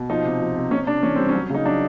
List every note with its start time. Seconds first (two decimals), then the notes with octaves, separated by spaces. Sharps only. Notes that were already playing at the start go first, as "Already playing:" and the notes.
Already playing: B2
0.10 F3 D#4
0.24 C3
0.40 F3
0.57 C3
0.71 C3 C#4
0.87 C3 D4
1.03 E3 C#4
1.15 G3 C4
1.29 C#4
1.34 F#3
1.50 C#3 D#4
1.65 F#3 D4